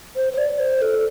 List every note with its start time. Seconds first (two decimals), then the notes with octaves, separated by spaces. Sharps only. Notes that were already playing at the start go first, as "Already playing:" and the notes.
0.16 C5
0.33 C5
0.38 D5
0.59 C5
0.82 A4